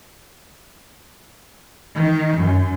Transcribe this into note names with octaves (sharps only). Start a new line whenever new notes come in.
D#3
F#2